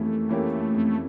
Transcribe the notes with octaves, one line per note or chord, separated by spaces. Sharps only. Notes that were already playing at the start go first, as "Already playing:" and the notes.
Already playing: F2 E3 A3 A#3 C#4 G4
E3 A#3 C#4 G4
F2